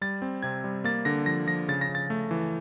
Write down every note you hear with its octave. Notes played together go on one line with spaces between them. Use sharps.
G3 A6
C4
C3 G#6
G3
A#3 A6
D3 A#6
F3 A#6
F3 A#6
C#3 A6
A#6
C#3
A6
A3
E3